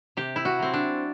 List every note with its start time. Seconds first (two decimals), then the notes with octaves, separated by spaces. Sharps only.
0.17 C3 G4
0.36 E4
0.45 F#4
0.59 F#3 C4
0.74 D4